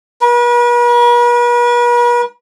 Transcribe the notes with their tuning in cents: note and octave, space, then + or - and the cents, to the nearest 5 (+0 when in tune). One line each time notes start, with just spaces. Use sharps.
B4 -45